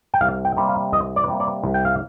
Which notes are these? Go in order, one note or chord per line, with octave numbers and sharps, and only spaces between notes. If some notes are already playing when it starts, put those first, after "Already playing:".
G5
C2 F5
G5
C3 G3 A#3
F5
C2 D#5
D5
C3 G3 A#3
D5
C2
G5
F5